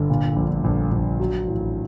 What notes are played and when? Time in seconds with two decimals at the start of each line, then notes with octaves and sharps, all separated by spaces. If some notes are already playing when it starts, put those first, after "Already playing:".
Already playing: G1 D3
0.10 A#2
0.36 A#1
0.64 A#1
0.92 A#1
1.20 F#3
1.47 A1